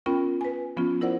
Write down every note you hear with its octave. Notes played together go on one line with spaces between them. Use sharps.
B3 C#4 F4 A#4 G5 B5
B4 G#5
F3 B3 C#4 F4
E4 A#4 C5 D5 F#5